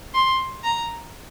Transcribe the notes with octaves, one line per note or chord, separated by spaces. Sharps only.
C6
A#5